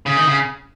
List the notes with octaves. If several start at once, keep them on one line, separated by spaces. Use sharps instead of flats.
C#3
D#3
C#3